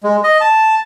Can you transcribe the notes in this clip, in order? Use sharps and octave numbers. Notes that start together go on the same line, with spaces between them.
G#3
D#5
A5